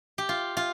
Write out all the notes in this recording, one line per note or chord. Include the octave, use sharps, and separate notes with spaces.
G4
F4
F4